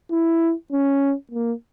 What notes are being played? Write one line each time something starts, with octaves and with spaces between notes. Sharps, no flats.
E4
C#4
A#3